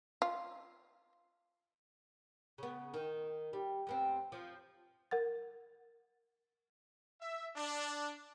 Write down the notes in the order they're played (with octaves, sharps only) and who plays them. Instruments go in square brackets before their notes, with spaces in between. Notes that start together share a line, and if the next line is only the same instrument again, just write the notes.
[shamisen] F4
[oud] C#3 B3
D#3
G3
F2 B3 C4
F3
[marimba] A#4 F#5 A6
[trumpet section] E5
D4